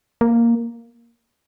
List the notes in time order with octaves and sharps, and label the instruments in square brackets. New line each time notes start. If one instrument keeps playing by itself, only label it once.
[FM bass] A#3